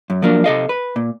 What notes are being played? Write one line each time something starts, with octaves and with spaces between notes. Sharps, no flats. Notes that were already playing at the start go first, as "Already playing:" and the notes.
F#2
F3 F#3 A#3 D4
C3 A4 D#5 F5
B4
A#2